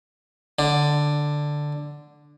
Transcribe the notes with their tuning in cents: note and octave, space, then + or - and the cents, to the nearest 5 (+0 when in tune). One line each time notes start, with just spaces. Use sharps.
D3 +5